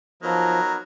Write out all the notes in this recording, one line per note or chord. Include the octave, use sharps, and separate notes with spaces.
F3 F#3 B3 D#4 A#4 A#5